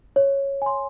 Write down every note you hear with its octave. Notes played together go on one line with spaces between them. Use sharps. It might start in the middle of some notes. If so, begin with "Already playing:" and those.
C#5
G#5 C6